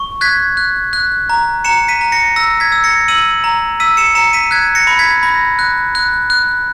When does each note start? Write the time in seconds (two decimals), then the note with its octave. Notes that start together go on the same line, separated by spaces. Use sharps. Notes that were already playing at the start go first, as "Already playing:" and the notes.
Already playing: C#6
0.21 F#6 G#6 B6
0.57 F#6
0.93 F#6
1.30 A#5
1.64 A#5 C#7 E7
1.88 B6 D#7
2.01 A#5
2.12 A#6 C#7
2.36 E6 A#6
2.60 G#6 B6
2.72 E6
2.84 A#6 C#7
3.08 E6 D#7 F#7
3.44 A#5
3.80 E6 B6 D#7
3.97 C#7 E7
4.15 A#5 C#7 E7
4.33 B6 D#7
4.51 F#6 G#6 B6
4.75 A#6 C#7
4.87 B5
4.99 G#6 B6
5.23 B5 A#6
5.59 F#6
5.95 F#6
6.30 F#6